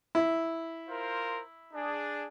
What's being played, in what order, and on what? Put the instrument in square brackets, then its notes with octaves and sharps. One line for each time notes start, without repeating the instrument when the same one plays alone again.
[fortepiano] E4
[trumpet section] F4 A#4 C5
D4 G#4